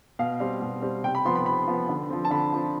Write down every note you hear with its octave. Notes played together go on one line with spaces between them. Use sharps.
B2 F5
G3 C4
B2
G3 C4
C3 G5
B5
F3 B3 C6
B5
C3 B5
F3 B3
D3
F3 C4
A5
D3 B5
F3 C4